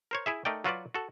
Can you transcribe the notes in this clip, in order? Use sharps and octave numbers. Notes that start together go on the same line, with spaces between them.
A#4 C5 C#5
E4 G#4 E5
A3 D#4 A#4 D5 G5
F#3 F4 F#4 B4 D5
F#4 A4